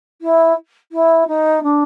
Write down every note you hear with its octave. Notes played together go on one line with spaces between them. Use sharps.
E4
E4
D#4
D4